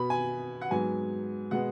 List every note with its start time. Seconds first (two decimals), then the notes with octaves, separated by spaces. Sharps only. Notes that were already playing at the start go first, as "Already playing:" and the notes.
Already playing: B2 B3 B5
0.10 G#5
0.61 F#5
0.71 G#2 F#3 B3 G#5
1.51 B2 G#3 B3 F#5